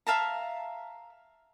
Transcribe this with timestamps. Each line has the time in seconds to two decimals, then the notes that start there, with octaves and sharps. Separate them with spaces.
0.07 E5 F5 A5 A#5